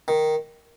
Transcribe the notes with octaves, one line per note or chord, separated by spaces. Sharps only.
D#3